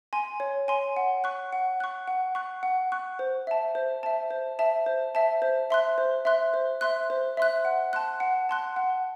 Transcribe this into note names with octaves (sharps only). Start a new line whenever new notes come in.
G#5 C6
C#5
G#5 C6
F#5
C#6 F#6
F#5
C#6 F#6
F#5
C#6 F#6
F#5
C#6 F#6
C5
E5 A5
C5
E5 A5
C5
E5 A5
C5
E5 A5
C5
E5 C6 F#6
C5
E5 C6 F#6
C5
E5 C6 F#6
C5
E5 C6 F#6
F#5
A5 C6 F#6
F#5
A5 C6 F#6
F#5